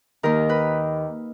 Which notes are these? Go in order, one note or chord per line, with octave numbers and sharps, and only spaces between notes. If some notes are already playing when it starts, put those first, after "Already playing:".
D#2 D#3 A#4
B4